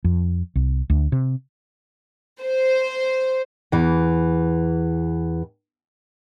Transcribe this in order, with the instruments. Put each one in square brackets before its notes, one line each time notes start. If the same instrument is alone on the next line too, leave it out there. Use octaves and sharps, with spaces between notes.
[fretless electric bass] F2
C2
D2
C3
[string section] C5
[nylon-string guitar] E2 E3